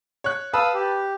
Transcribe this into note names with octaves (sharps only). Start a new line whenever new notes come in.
C#5 F#6
B4 F5 A5 B5 D#6 E6
G4